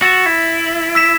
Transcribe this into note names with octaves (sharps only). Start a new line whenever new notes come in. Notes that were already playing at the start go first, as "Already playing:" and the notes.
F#4 E6 A6 E7
E4
E6 B6 E7